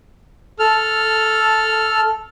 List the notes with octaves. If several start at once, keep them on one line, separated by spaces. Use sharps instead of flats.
A4 F6